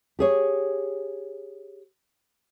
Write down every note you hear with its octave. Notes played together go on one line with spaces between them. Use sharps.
G4 G#4 C#5